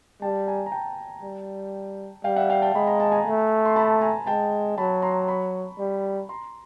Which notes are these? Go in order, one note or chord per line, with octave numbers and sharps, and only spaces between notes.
G3 G5 A5
G#5 A#5
A#5
G5 A5
G3
G3 F5 G5
E5 F#5
F5 G5
G5 A5
G#3 B5
A#5
A5
G#5 A#5
A3
C6
A5 B5
G#5 A#5
G#3 G5 A5
F#3 A5 B5
A#5 C6
B5 C#6
G3
A#5 C6